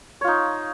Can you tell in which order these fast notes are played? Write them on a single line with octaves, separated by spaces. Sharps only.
C#5 F4 D#4